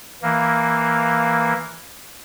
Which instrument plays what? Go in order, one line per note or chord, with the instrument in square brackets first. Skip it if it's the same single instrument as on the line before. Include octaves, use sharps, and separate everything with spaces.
[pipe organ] E3 A#3